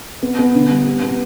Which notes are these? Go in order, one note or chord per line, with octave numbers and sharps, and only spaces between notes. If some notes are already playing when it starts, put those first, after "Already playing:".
B3
B3
D3
G3
B3
B3